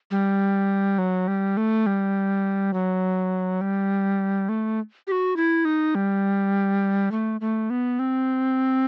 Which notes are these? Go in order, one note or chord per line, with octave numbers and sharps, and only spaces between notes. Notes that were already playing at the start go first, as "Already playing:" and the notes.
G3
F#3
G3
A3
G3
F#3
G3
A3
G4
F#4
E4
D#4
G3
A3
A3
B3
C4